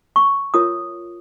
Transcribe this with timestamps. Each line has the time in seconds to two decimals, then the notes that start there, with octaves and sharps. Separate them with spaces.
0.16 C#6
0.54 F4 A#4 C#5 D#6